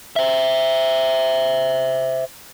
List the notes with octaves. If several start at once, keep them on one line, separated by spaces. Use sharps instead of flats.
C5 E5